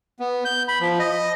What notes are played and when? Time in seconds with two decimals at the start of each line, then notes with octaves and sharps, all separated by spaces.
0.20 B3
0.45 G6
0.68 B5
0.80 F3
0.99 D#5